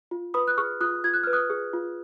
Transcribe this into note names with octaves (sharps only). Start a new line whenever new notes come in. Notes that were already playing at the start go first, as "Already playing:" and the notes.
F4
B4 B5 D#6
F#6
G#4 C#6 F6
F4 D#6 F#6
F4 G#6
F#6
B4 F6
D#6 F#6
G#4
F4